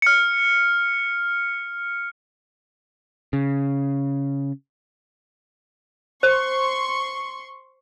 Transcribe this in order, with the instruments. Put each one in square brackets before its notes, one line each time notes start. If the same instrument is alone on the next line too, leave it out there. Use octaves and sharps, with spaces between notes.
[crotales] F6 C#7
[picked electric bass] C#3
[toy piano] C5 [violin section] C6 C#6